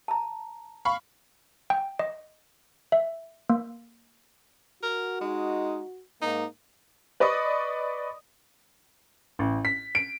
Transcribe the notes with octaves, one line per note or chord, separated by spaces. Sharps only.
A5 A#5
F5 B5 C#6
G5
D#5
E5
A#3
F#4 A#4
G#3 D#4
G#2 A#3 D#4
B4 D5 D#5 B5 C#6 D#6
A1
B6
D7